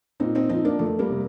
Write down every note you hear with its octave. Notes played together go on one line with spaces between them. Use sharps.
A#2 C4 D#4
C4 D#4
F3 C4 D#4
A#3 D4
F2 A3
G3 A#3
C3